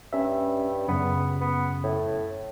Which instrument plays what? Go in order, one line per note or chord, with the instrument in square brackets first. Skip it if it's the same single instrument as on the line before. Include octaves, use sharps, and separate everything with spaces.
[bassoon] G2 [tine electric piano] C#4 E5
[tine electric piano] F#2 C#3 [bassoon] B3
[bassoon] B3
A2